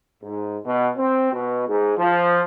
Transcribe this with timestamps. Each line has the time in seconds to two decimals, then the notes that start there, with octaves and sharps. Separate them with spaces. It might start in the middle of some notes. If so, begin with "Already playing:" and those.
0.23 G#2
0.65 B2
0.97 C4
1.33 B2
1.68 G#2
1.98 F3